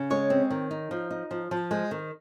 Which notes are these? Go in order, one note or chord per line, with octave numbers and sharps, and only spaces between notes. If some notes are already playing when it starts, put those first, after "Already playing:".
Already playing: C#3
G#3 C#5
C4
D#3
D#4
F3
D#4
F3
F3
G#3 C5
D#3